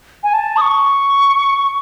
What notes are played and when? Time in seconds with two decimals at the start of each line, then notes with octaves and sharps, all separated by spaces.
0.24 G#5
0.34 A5
0.57 D#6
0.61 C#6